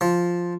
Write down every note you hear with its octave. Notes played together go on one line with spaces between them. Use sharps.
F3